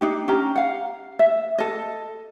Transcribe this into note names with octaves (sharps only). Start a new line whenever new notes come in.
D4 D#4 G4
C#4 G4 A#5
F5 F#5
E5
A4 D#5